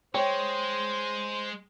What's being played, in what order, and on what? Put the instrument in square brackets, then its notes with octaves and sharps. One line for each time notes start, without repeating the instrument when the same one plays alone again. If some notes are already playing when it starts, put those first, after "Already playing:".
[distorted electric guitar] G#3 [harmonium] C5 [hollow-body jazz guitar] C#5 [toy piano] G5